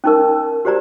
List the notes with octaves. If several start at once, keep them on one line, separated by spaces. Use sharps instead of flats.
C#4 D#4 A#4
F#4 G4 C5 D5 A#5